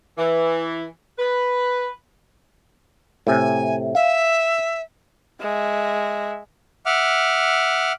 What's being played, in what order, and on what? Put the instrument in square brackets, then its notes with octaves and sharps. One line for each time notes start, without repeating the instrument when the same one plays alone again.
[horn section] E3
B4
[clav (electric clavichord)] A2 C3 [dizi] G#5
[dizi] E5 [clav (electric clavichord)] F5
[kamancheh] G#3 E5
[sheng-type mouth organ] E5 F#5 D6 F6